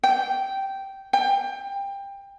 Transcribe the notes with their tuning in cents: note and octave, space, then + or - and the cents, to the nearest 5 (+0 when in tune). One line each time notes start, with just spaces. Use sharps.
G5 -10
G5 +20